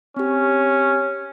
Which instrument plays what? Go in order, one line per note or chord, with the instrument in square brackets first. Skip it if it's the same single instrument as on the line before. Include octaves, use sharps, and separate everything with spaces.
[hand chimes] C4 G4 [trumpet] C#4